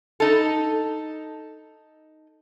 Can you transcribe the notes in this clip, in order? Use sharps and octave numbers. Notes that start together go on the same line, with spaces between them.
D#4 A4